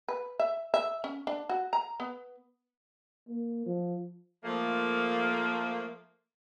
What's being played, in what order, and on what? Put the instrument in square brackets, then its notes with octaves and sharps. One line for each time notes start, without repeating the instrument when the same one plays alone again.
[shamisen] B4
E5
E5
C#4
D4
F#4
A#5
B3
[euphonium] A#3
F3
[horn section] F3 A3 A#3